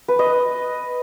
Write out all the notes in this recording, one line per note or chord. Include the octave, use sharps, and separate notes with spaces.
B4
D#5